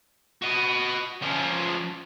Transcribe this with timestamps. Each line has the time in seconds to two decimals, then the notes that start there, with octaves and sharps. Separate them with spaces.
0.42 F#4 D#5
1.22 F3 C#4